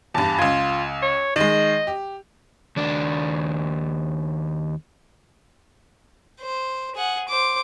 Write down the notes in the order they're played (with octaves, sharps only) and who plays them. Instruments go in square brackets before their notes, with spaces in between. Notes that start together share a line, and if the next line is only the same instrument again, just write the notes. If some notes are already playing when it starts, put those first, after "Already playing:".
[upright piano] E2 G2 [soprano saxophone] A5
[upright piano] C#2 G#6 [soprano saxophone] F4
[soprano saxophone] C#5
[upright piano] D#3 G#3 [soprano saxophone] D#5
[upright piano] G4
[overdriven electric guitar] D#2 D4
[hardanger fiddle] C5
G#4 F#5
C5 D6